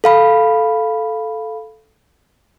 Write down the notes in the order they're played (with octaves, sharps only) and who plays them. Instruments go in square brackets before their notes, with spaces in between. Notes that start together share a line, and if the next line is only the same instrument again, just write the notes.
[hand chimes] A4 F5 B5